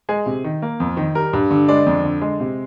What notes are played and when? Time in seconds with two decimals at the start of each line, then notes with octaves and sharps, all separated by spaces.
0.09 G#3 G#4
0.26 C3
0.44 D#3
0.62 A#3
0.80 F2
0.97 D#3
1.15 G3 A#4
1.33 G2
1.51 D3
1.68 G#3 D5
1.86 F2
2.04 D3
2.21 G#3
2.40 C3